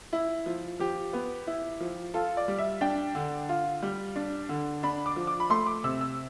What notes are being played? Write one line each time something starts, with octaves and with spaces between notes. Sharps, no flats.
E4
F3
F3 G4
B3
E4
F3
F4 A4
D5
G3
E5
D4 G5
D3
F4
G3
D4
D3
D4 B5
D6
F3
D6
B5
A3 C6
D6
C3 E6
E6